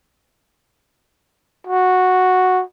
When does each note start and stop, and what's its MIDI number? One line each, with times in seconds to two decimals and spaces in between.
1.67 2.63 66